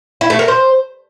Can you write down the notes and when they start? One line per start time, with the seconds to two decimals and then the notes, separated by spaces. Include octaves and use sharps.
0.21 E4
0.30 A3
0.39 A#4
0.48 C5